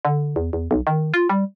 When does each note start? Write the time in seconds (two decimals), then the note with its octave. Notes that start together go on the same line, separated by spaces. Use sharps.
0.05 D3
0.36 E2
0.53 E2
0.71 B1
0.87 D#3
1.14 F4
1.29 G3